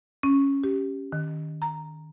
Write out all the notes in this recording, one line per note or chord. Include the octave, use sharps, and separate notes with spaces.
C#4
G4
D#3
A#5